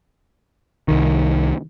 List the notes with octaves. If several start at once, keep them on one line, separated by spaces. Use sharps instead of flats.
C2 D#3